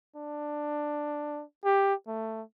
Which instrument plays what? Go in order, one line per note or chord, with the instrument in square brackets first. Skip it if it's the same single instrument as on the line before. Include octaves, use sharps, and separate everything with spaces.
[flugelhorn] D4
G4
A3